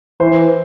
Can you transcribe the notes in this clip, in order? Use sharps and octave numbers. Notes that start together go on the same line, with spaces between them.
E3 C5